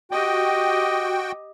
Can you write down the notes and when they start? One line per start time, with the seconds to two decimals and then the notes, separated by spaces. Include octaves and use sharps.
0.11 F#4 G4 D#5 G5